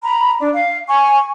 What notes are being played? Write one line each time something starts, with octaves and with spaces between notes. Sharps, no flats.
A#5 B5
D4
F5
G#5 C#6